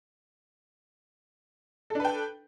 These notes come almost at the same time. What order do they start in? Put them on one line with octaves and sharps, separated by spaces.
A4 D4 B4 G5